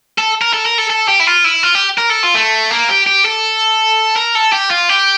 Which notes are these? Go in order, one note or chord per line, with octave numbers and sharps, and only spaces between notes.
A4
A#4
A4
A#4
A4
A4
G4
E4
F4
E4
F4
G4
A#4
A4
F4
A3
A#3
G4
G4
A4
A#4
A4
G4
F4
G4